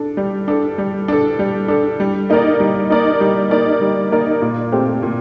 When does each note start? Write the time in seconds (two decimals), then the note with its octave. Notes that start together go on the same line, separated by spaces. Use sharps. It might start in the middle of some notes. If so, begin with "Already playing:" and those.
Already playing: D4 A4
0.17 G3
0.48 D4 A4
0.78 G3
1.08 D4 A4
1.39 G3
1.68 D4 A4
2.00 G3
2.30 A#3 D#4 A#4 D5
2.60 G3
2.90 A#3 D#4 A#4 D5
3.21 G3
3.51 A#3 D#4 A#4 D5
3.81 G3
4.12 A#3 D#4 A#4 D5
4.42 A#2
4.72 A3 C4 G4
5.03 A#2